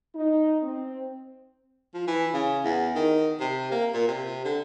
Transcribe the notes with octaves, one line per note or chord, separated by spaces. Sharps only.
D#4
C4
F3
E3
C#3
E2
D#3
C3
A#3
A#2
C3
D3